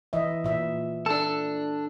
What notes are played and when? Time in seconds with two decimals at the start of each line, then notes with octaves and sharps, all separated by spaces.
0.13 E3 D#5 E5
0.44 A#2 E5
1.06 D4 A4